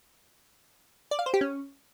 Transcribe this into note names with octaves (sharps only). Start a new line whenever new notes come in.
D5
F5
C5
G4
C#4